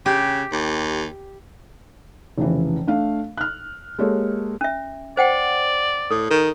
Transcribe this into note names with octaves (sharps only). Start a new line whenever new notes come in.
C#3 G4
D#2
F1 C#3 E3
A3 D4 F5
F6 F#6
G#3 A#3 G4 A4 C#5
C#4 E5
C5 D5 F#5 G5
A2 A4
D#3